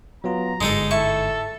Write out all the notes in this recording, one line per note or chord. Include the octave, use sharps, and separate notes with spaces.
F#3 B3 F4 A#5
G1 G#2 G#3 D#4 A4
E4 A4 C#6